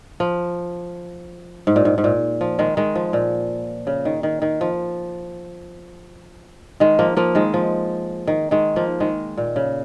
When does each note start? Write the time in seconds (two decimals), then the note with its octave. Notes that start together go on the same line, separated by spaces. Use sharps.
0.20 F3
1.67 G#2
1.76 A#2
1.85 G#2
1.98 G#2
2.04 A#2
2.41 F3
2.59 D#3 G#3
2.77 D#3 G#3
2.95 F3
3.13 A#2
3.87 C#3
4.05 D#3
4.23 D#3
4.42 D#3
4.61 F3
6.80 D#3 G#3
6.99 F3 A#3
7.17 F3 A#3
7.35 D#3 G#3
7.54 F3
8.27 D#3
8.51 D#3 G#3
8.76 F3 A#3
9.00 D#3 G#3
9.37 A#2
9.56 C#3